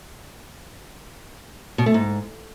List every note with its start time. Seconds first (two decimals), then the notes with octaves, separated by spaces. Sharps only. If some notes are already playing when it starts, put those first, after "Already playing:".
1.78 B2
1.86 A3
1.94 G#2